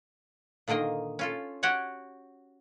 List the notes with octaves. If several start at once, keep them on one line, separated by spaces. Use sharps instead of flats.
A#2 D3 D#3 A#3 D#5
C#4 F4 A4
F#4 G4 C#5 F#5 G#5